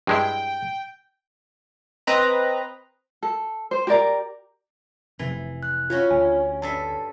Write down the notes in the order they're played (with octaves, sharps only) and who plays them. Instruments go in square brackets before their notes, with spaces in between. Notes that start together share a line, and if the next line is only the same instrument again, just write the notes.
[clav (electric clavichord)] G2 G#3 E4 [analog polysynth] G5
[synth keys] C4 B4 D#5 A#5
[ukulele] A4
C5
G4 A#4 D5 A#5
[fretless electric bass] F1 C3 [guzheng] E3
[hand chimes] F#6
[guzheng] C#4 F#4 C#5 [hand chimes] F4
[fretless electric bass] D2 D3 [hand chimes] G#5
[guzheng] G2 A4 E5 [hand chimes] A5